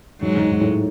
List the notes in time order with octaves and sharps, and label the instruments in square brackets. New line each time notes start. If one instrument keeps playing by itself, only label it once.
[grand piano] G#2 [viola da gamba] F#3 G#3
[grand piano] G#2
G#2
A2